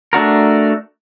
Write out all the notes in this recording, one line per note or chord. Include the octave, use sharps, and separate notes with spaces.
A3 D4 F#4 A#4